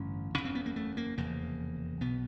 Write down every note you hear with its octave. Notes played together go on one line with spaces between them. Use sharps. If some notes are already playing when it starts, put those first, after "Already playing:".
Already playing: A1 G2 D3 C#4
F#1 E2 C#3 C#4
C4
B3
A#3
A3
A#3
F1 E2 C#3 A#3
B1 B2 B3